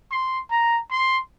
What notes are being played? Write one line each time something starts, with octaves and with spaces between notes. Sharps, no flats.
C6
A#5
C6